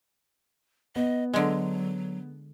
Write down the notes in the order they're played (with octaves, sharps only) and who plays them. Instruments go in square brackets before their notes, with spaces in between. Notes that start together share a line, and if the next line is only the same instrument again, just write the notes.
[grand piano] B3 [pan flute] D#5
[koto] D3 G#3 [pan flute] F#3